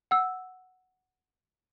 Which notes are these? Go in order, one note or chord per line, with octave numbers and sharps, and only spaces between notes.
F#5 E6